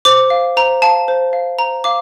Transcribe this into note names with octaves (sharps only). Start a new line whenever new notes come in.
C5 D6
F5
C5 A#5
F5 A5
C5
F5
C5 A#5
F5 D6